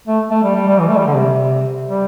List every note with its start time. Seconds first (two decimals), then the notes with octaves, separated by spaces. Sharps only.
0.08 A3
0.31 A3
0.44 G3
0.55 G3
0.68 G3
0.80 E3
0.88 A3
0.98 G3
1.07 D3
1.15 C3
1.87 G3